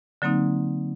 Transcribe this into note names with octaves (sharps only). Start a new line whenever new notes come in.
D3 F#3 A#3 C4 D#4